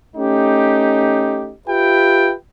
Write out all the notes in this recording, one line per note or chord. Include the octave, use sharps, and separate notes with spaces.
A3 C#4 D#4 G4
F4 G4 B4 E5 G5